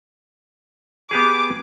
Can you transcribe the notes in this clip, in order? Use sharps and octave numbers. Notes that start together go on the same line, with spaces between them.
B3 G4 G#4 D6